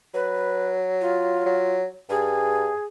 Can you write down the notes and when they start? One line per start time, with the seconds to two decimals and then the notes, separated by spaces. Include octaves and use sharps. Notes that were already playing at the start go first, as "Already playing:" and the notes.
0.14 F#3 B4
1.01 F4
1.46 F#3
2.10 G2 G#4